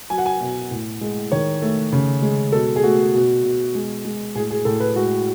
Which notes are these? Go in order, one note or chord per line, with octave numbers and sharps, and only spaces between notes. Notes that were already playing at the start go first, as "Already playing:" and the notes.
F#3 G#5
F#5
G#5
B2
A2
G#3
D#3 C#5
A3
C#3
G#3
B2 A4
G#4
A3 F#4
B2
B2
G#3
G#3
A2 G#4
G#4
A2 A4
B4
G#3 F#4